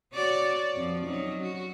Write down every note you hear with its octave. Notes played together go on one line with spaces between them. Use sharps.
F#4 C#5 D5
F2 F3
F#3 C#4 D#4
F#4